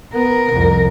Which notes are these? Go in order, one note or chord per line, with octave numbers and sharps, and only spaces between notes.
B3 A#4
C2 F2